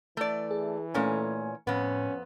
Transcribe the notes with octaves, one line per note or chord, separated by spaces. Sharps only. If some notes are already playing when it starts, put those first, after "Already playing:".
E3 A3 D5
G#4
A#2 A3 C#4 A4 G#5
F2 A2 B3 C#4